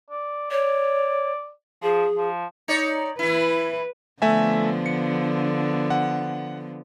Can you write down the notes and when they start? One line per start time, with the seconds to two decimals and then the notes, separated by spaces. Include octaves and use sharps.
0.10 D5
0.51 C#5 D5
1.83 F3 G#4
2.15 F3
2.68 D#4 C#5 D5
3.19 E3 E4 B4
4.22 D3 F3 A3 B3 E5 G#5
4.86 C#7
5.90 F#5